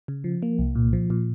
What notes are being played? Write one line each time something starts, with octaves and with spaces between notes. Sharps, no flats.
C#3
F3
A#3
C2
A#2
F3
A#2